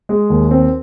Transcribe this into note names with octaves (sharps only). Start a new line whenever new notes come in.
G#3
D#2
C4